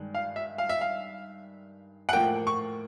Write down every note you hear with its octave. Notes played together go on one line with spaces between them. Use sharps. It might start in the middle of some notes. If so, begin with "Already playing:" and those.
Already playing: G2 D#3 G#3
F5
E5
F5
E5
F5
F#5
A2 F3 A#3 G5
C#6